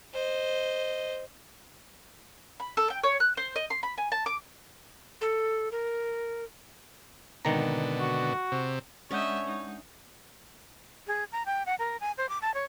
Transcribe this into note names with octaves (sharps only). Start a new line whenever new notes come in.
C5 D#5
B5
A4
G5
C#5
F#6
C5
D#5
C6
B5
G#5
A5
D6
A4
A#4
G#1 B2 D3 D#3 A#5
F#4
C3
G#3 C#4 D4 C#5 D#5 E5 F#5 G6
D#4
G#4
A#5
G5
F#5
A#4
G#5
C5
D6
A5
C#5